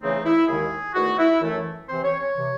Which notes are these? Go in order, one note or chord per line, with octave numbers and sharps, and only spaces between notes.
E2 C#3 E3 A3 C4 D#4
E4
D#2 D#3 G#3 G#4
E2 D#3 A3 F#4
E4
F#2 E3 A3
C3 E3 C4 C5
C#5
C#5
C3 E3